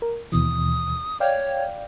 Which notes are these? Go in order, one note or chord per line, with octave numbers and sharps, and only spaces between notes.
A#4
D#2 B2 E3 D#6
C#5 D5 F5 G5